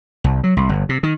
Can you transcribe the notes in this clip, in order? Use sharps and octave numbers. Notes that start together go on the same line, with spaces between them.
C2
F#3
C2
G1
C3
D#3